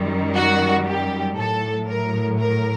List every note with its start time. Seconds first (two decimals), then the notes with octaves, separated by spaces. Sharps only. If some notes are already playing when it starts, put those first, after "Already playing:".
Already playing: F#2 D#3 G3
0.36 F#4
0.87 G4
1.37 A2 F#3 A4
1.88 A#4
2.39 A#4